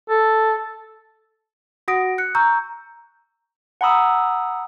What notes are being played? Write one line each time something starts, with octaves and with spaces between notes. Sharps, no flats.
A4
F#4 F#5 D#6 A#6 D7
F#6 C#7
A#5 C#6 E6 G6
F#5 G#5 A#5 B5 D#6 E6